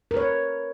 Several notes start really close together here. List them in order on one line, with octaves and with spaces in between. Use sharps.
A#4 B4 C#5